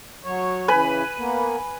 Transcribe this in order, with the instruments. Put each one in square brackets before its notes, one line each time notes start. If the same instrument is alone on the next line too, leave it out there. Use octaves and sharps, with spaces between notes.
[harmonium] F#3 C#5
[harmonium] C#3 E3 [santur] B4 G#5 B5
[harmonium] A#3 B3